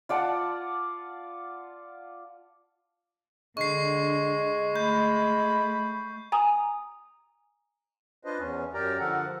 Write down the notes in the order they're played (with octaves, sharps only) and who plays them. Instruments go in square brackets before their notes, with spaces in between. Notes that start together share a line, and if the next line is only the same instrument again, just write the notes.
[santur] F4 D5 F#5 A5
[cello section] D3 [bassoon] G#3 [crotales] C#6 C7
[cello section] A3 [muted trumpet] B5 [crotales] G6
[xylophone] G#5 A#5 D#6
[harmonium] D4 F4 B4 C5 D#5
E2 C#4
F#2 G4 A#4 D5 G5 A#5
D3 F3 A4 A#4 F#5